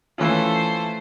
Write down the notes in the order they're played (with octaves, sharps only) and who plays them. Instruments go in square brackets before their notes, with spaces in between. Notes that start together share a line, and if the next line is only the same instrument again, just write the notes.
[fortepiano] E3 C#4 F4 [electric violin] A3 C5